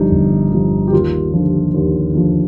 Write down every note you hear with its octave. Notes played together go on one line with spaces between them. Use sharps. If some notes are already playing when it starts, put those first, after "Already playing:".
Already playing: G1 G2 F3 D#4
G1
G2 F3
G4
D#2 F4
D3 F3
D#2
D3 F3